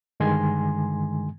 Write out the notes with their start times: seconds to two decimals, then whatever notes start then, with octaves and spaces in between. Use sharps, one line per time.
0.20 G2 D3 D#3 G#3 G#5 C6